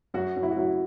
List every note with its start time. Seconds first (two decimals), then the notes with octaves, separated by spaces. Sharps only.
0.14 F#2 F#4
0.36 F#2
0.43 E4
0.51 F#4
0.57 F#2 E4